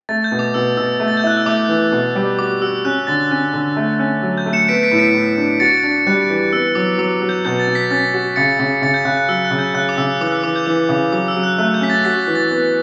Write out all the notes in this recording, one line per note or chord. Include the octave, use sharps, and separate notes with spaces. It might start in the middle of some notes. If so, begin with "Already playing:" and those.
A3 A6
G6
B2
D6
B2 E6
B2 E6
A3
A6
G6
E4 F#6
E6
A3 D6
E3
B2
G3
F#4 D6
F#4 E6
C#4 F#6
D3 A6
C#4
D3
A3
C#4
F#3
G6
A3
C#7 E7
B3 B6 D7
B6 D7
A2
B6 D7
A2
D4
F#4 A6 C#7
D4
G3 F#6
E3
B3 E6
F#3 D6
F#3 D6
F#3
G6
B2 G6
A6
B2
B6
C#4 A6
F#4
C#3 A6 C#7
C#3
C#3 A6 C#7
G6
C#3 F#6
F#6
F#3 E6
F#6
C#3
G6
C#3 F#6
D6
C#3 E6
E3 D6
F#6
E6
E3 D6
G6
E3 D6
C#3 D6
F#3 D6
E6
F#3
F#6
A3 F#6
G6
C#4 B6
A6
F#4 B6
E3
A6
B3